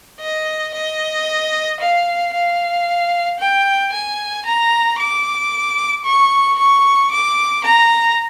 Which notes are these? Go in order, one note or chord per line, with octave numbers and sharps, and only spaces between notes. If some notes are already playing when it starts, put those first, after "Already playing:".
D#5
D#5
F5
F5
G5
G#5
A#5
D6
C#6
C#6
D6
A#5